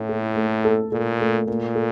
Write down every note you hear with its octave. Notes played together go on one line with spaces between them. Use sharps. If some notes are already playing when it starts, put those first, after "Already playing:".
Already playing: A2 E4
A4
A3
A4
A#2 A4
A3
A#2 A#3
A4